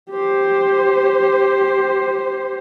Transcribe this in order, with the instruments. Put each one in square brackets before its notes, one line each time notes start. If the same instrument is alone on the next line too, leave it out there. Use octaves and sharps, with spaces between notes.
[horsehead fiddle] G4 C5